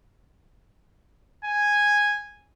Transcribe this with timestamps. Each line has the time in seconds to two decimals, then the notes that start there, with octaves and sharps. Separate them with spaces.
1.45 G#5